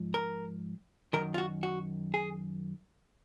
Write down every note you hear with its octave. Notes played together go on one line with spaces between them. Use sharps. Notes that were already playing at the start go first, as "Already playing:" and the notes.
Already playing: G#2 F3
A#4
F#2 D#3 A#4
F4
F#4
F#4
G#4